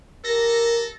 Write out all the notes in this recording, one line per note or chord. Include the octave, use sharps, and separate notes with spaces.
G4 A4 A#4 A#6